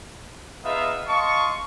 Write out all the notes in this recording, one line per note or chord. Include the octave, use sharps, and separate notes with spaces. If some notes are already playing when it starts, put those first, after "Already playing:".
B3 D#4 F4 G#4 E5 F5
D#5 F5 A5 C6 C#6